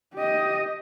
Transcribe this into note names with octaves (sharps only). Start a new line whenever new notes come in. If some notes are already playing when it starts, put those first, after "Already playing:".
G4 D#5